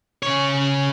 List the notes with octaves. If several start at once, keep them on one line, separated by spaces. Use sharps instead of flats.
C#3 C#5